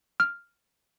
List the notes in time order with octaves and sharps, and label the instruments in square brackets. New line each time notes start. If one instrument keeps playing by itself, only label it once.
[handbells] F6